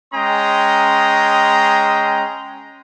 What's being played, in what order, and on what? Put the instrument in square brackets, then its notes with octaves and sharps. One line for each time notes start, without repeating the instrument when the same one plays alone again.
[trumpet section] G#3 C#4 G5 A#5 C6 D#6